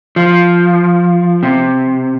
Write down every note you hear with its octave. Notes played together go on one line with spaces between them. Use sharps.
F3
C3